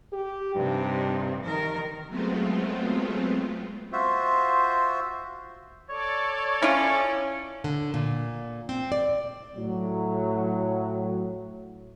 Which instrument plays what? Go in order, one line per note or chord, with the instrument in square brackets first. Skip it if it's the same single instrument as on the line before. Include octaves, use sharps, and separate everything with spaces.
[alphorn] G4
[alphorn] G2 [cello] C3 D#4
[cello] D#3 A#4
[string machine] F#3 G#3 A3 B3 C4 F4
[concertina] F4 F#4 C5 E5
[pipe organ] A4 D5 [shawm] C#5
[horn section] C#4 [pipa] E4 F4
[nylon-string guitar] D3
A#2
C4
D5
[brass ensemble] A2 F#3